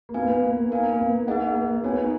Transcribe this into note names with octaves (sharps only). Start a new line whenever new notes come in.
A#3
B3 D#4 F#4 B4 F5 G#5
B3
A#3
D#4 A#4 F5 G#5
A#3
B3
A#3 B3 D#4 G#4 D#5 F#5
A#3
B3 F#4 C#5 G#5
D#4